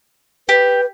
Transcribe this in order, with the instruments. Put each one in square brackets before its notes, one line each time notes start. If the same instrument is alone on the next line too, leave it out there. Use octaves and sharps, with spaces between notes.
[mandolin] G4 [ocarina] B4